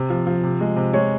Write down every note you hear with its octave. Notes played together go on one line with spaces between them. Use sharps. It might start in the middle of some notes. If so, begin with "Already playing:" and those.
Already playing: C3
F3
F3
C3
G#3
C3
G#3 C#5